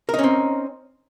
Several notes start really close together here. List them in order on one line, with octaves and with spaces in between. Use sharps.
A#4 D#4 C#4 C4